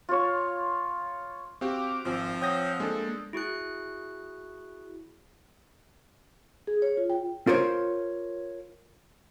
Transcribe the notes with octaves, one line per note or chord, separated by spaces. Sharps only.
F4 C#5
C4 F#4 G4 F5 D6
G#1 F3 C4
C#5 F#5 G5 D#6 G6 A#6
G#3 A#3 D4 A4
E4 F#4 G#4 F#6
G#4
C#5
F4
G5
F4 A#4 C5 C#5